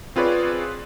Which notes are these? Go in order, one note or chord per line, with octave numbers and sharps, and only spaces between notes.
C4 F4 G#4 B4 C#5 D5